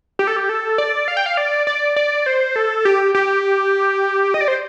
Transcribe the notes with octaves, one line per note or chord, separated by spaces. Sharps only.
G4
A4
G4
A4
D5
F5
G5
F5
D5
D5
D5
C5
A4
G4
G4
D#5
D5
C5